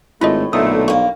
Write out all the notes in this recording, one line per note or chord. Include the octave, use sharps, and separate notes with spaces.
G#1 A2 A3 E4 F4 D#5
B1 A#2 D3 A3 D#6
G2 A#3 C#6